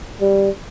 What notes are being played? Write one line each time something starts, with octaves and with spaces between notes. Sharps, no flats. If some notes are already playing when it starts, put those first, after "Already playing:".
G3